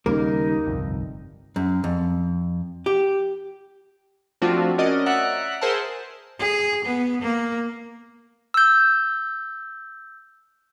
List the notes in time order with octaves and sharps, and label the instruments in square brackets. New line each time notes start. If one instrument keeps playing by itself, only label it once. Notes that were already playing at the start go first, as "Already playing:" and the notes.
[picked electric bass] D#2 C#3 G3 [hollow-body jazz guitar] A#3 A#4 [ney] D#4
[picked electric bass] G1 C2 F2
[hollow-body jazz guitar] F#2
F2
G4
[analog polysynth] F3 A3 C4 D4 F4 F#4
C#4 F#4 A#4 D5 D#5
D5 E5 F#5 A#5 F#6
G#4 A#4 C5 E5 F#5 A5
[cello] G#4
B3
A#3
[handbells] E6 G6